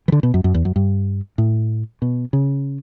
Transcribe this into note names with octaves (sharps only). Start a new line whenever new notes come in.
E3
D3
B2
F#2
F#2
E2
F#2
G2
A2
B2
C#3